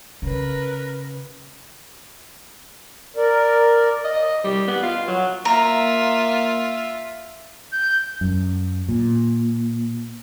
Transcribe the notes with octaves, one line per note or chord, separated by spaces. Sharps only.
C#3 A#4 B4
A#4 D5
D#5
G3
B3
F4
F#3
A#3 F4 E5 A#5
G6
F#2
A#2